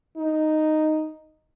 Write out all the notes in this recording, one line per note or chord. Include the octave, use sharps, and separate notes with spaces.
D#4